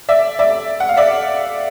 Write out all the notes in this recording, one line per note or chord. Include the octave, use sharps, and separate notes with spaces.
D5 E5
D5 E5
F#5
F5
D5 E5